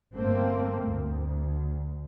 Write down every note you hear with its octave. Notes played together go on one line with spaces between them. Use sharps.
G1 G2 A3 A#3 C4
D2